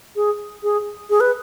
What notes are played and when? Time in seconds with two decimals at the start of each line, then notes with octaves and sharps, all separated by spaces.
0.16 G#4
0.63 G#4
1.10 G#4
1.20 B4